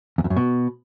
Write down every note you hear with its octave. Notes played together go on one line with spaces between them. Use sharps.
E2
F2
F#2
B2